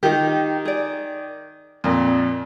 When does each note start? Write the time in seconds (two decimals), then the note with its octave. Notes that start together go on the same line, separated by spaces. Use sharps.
0.03 D#3 D#4 F4 G4
0.65 G#4 D5
1.84 F2 A#2